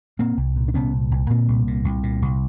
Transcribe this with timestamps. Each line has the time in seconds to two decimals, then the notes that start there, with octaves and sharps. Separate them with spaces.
0.19 A#2 A#3 C4
0.37 C2
0.56 A#2
0.68 D4
0.74 C2 B3 C#4
0.93 A#2
1.11 C2
1.30 A#2 A#3 C4
1.48 C2
1.67 A#2
1.85 C2
2.03 A#2
2.22 C2